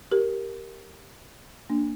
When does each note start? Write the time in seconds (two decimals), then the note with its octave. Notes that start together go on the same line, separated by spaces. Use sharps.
0.11 G4 A#4
1.70 A#3 D4